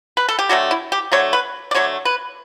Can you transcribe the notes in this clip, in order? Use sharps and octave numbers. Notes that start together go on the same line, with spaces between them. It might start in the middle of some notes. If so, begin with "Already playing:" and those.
B4
A4
G4
D3 F#3 A3 F#4
E4
G4
D3 F#3 A3 C#5
B4
D5
D3 F#3 A3 C#5
B4